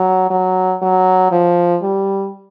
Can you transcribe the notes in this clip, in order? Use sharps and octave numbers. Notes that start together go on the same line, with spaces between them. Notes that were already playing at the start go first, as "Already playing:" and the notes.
Already playing: F#3
F#3
F#3
F3
G3